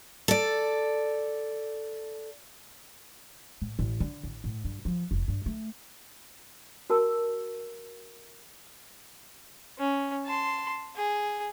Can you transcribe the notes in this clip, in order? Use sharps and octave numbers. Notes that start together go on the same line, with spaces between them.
A4 D5
A2
A1
D3
A1
A2
G2
F3
F1
G2
A3
F#4 A#4 A5 E6
C#4
A5 C6
G#4